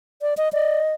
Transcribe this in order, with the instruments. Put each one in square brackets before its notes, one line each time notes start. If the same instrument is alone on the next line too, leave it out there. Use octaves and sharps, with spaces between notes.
[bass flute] D5
D#5
[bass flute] D5 [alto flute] D#5